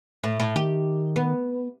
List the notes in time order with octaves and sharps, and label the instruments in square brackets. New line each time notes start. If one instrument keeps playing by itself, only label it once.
[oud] A2
A2
[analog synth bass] D#3 [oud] G4
[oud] B3